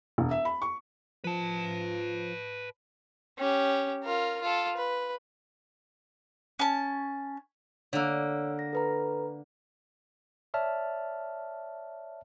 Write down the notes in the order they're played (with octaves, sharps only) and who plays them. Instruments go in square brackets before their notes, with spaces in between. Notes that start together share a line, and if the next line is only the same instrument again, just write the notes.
[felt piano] E1
E5
B5
C#6
[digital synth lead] F3 [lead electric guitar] B4 A5
[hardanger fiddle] C#4 G4
F4 A#4
F4 A4
B4
[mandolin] C#4 A5
[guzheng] D3 A#3 [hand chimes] C#5 E6
[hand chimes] A#6
A4 B4 A#5
[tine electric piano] C#5 D5 E5 A5 F6